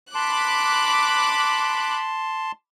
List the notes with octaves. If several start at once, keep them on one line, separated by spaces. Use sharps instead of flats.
A5 B5 C6 D6 F#6